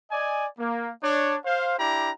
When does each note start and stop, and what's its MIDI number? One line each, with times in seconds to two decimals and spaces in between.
0.11 0.46 74
0.11 0.46 75
0.11 0.46 80
0.58 0.90 58
1.03 1.37 62
1.03 1.37 73
1.45 1.78 72
1.45 1.78 77
1.78 2.10 62
1.78 2.10 64
1.78 2.10 67
1.78 2.10 82